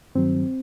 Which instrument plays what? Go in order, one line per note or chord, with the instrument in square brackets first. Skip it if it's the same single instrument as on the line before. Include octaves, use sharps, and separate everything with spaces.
[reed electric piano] G2 D#3 F#3 C4